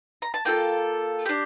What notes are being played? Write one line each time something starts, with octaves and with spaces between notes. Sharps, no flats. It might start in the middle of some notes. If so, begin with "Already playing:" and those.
A#5
A5
A#3 F4 A4 G5
D4 G4